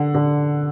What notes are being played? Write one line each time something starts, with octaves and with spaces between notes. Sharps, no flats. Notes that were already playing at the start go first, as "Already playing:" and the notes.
Already playing: D3 F#5
D3